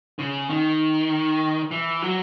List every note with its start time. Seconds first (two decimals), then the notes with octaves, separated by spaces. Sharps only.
0.19 C#3
0.50 D#3
1.71 E3
2.02 F#3